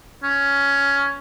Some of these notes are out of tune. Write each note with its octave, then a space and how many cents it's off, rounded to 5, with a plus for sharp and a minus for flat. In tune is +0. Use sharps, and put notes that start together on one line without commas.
C#4 +10